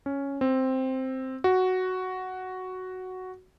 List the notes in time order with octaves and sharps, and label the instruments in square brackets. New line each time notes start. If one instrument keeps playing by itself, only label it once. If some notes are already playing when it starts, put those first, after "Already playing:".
[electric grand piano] C#4
C4
F#4